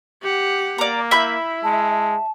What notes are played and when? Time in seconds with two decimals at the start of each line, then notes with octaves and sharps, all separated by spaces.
0.22 G4 F#5
0.78 A#3 D5 A#5
1.11 E4 E5 B5 G6
1.64 G#3 A5